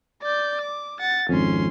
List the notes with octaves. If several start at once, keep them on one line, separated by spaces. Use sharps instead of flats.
D5 G6
D6
F#5 A6
G#1 F2 C#4 C6